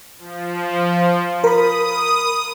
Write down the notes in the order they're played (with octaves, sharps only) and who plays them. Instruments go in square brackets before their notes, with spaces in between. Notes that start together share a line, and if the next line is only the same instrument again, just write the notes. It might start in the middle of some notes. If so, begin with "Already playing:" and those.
[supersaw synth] F3
[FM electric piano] A#4 B5 [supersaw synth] D#6